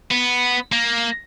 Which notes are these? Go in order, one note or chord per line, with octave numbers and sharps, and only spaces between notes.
B3
A#3